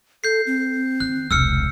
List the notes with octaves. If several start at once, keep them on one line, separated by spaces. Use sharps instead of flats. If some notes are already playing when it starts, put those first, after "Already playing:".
A4 G6 C7
C4
D#3 F#6
E1 C2 E6 F6 C#7